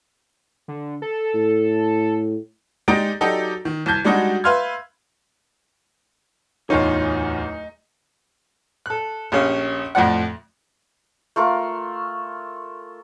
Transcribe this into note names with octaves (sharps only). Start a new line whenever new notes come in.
D3
A4
A2
G#3 D#4 G4 D5 A#5 D7
F#3 D#4 G4 A4 D5
D#3
C2 A5 G6 G#6
G3 G#3 D4 D#4 F#4
B4 E5 F5 C6 F6 G#6
D1 E2 D#4 F4 C#5
A4 F#6
A#1 C#4 G4 G#4 C#5 F5
F2 A2 F3 D5 F#5
A3 F4 A#4